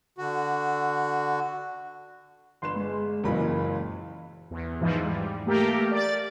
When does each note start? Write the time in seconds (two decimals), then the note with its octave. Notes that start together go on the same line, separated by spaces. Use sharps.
0.18 D3 F#4
2.62 G1 B4 C6 E7
2.76 G#3
3.24 F#1 A#2 E3 F#3 G#3 A#3 B5
4.51 E2
4.81 G#2 E3 F3
5.04 G3
5.46 A3 A#3 G4 A#4
5.91 D5 A6